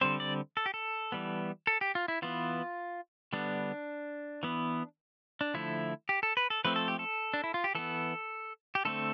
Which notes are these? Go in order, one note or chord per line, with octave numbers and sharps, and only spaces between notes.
D3 G3 C4 C5
D5
A4
G4
A4
E3 G3 B3
A4
G4
F4
E4
E3 B3 F4
D3 G3 B3 D4
E3 B3
D4
D3 F3 A3 E4
G4
A4
B4
A4
F3 A3 C4 B4
A4
G4
A4
D4
E4
F4
G4
E3 B3 A4
G4
D3 A3 C4 A4